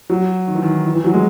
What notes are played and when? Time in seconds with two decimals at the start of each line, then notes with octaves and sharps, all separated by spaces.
0.10 F#3
0.47 D#3
0.55 E3
0.62 D#3
0.85 E3
0.96 E3
1.04 F#3
1.13 G#3